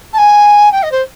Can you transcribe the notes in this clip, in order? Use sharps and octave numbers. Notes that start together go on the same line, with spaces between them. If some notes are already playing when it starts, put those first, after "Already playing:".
A5
G#5
G5
D#5
C5